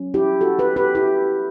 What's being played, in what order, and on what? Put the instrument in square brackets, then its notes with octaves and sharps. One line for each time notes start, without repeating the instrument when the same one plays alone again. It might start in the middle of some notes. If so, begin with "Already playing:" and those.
Already playing: [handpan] F#3 C#4
E4 G4
F#4 A4
G4 B4
G4 B4
E4 G4